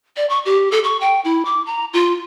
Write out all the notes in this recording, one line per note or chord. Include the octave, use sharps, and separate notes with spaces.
D5
C#6
G4
A4
C#6
G5
E4
D6
A#5
F4